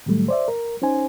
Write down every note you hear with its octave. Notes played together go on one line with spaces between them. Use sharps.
A2 D#3 F#3 G3 A3
C5 D5 E5
A#4
C#4 D#4 C5 G#5